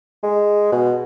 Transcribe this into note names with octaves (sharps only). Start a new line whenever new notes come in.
G#3
B2